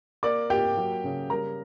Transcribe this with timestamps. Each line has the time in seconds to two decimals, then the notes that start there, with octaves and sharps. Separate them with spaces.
0.23 A#3 D5 D6
0.50 A#3 G4 G5
0.77 F#3
1.04 C#3
1.30 G3 A#4 A#5